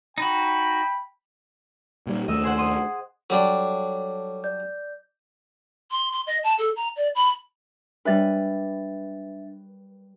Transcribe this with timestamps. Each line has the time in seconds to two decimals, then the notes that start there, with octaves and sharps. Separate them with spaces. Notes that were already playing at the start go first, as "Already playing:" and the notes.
0.18 D#4 F#4 G5 B5
2.07 A#2 G3
2.28 D#2 A3 D#5 E6
2.44 G#4 C5 F#5
2.58 C6 D#6
3.30 F#3 G3 D4 A4 C#5
4.44 D5 G6
5.91 C6
6.12 C6
6.27 D#5
6.44 A5
6.59 A4
6.76 A#5
6.96 D5
7.15 B5
8.05 G3 D4 B4 E5 A6